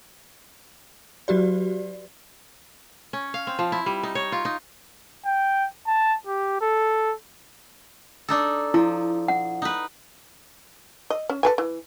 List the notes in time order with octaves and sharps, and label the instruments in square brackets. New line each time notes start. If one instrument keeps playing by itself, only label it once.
[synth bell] F#3 F#4 G4 D5
[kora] C#4
F5
C4
F3
E4
G3
D#4
C#5
F4
D#4
[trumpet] G5
A5
G4
A4
[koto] D4 D#4 A4
[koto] F3 [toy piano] E4
[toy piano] F#5
[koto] D#4 B4
[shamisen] D#5
C#4
A4 B4 G#5
E3